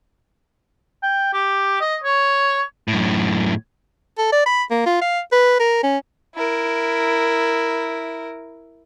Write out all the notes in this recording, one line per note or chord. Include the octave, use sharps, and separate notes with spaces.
G5
G4
D#5
C#5
F#2 A2
A4
D5
B5
A#3
F4
F5
B4
A#4
C#4
E4 A#4